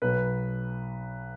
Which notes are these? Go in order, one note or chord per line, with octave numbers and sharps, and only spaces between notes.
B1 B2 F#3 B4